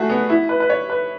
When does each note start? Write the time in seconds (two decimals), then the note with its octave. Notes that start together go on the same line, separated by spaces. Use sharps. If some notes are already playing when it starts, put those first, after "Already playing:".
Already playing: A3 F#4 G#4
0.10 B3
0.30 E4
0.49 B4
0.60 B4
0.70 C#5
0.90 B4